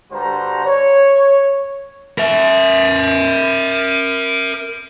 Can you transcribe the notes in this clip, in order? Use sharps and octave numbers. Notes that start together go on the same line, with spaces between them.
G2 D3 G3 F#4 C5 A#5
C#5
A#4 E5